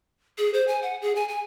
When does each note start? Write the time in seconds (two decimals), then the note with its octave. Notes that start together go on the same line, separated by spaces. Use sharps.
0.38 G#4
0.54 C5
0.68 G#5
0.83 F#5
1.02 G#4
1.15 G#5
1.29 G#5